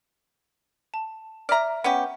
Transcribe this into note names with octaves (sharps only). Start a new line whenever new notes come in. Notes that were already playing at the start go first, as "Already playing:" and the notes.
A5
D5 E5 A#5 F6
B3 C#4 G4 F#5